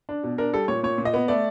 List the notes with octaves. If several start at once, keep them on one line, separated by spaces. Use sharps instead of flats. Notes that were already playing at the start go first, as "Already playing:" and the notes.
D4
B2
D4 A#4
G3 A4
A#2 C#5
A#2 C#5
A#2
D#5
B3
A3 D5